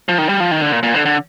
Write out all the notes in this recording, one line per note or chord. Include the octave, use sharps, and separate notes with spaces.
F3
D#3
G3
F3
D#3
D3
A#2
A#2
D3
D3